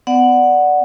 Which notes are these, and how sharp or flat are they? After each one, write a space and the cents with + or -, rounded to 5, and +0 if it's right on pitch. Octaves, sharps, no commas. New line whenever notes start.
B3 +35 D5 +0 F#5 +0